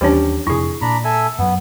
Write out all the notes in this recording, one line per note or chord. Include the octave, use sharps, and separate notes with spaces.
D#2 E3 G3 C#4 D4
F2 C3 E4 G#4 C#6
A#2 D4 A#5 B5
A4 E5 G#5
F#2 F#3 B3